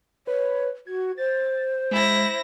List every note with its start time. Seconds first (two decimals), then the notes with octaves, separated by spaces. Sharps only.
0.27 B4 C#5
0.87 F#4 G#6
1.18 C5 A6
1.91 G#3 E4 A#6